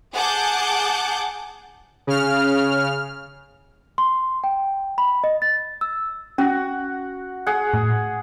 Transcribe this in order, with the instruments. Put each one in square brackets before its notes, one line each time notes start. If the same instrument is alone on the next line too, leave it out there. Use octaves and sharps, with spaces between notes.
[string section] G#4 F#5 A5 D6 G6
[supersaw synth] C#3 F6
[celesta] C6
G5
B5
D#5
A6
E6
[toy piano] C#4 [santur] F#4
[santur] G#4 F#5
[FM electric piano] A2